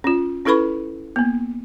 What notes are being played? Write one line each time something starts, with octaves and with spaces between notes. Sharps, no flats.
C#4 F4
C#4 E4 A4 B4 B5 C#6
A#3 B3